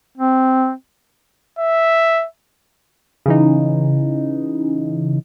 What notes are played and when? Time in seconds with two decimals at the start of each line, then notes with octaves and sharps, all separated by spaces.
0.18 C4
1.59 E5
3.26 C#3 E3 D#4